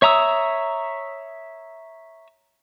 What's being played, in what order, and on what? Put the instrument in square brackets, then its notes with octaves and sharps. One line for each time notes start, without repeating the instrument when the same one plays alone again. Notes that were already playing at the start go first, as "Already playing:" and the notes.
[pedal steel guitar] C#5 E5 A#5 D#6 E6